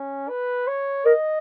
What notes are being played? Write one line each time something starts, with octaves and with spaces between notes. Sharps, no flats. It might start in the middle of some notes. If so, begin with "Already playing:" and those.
Already playing: C#4
B4
C#5
A#4 D#5